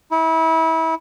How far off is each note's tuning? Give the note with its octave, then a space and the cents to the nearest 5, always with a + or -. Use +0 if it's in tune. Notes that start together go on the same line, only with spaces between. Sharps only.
E4 -30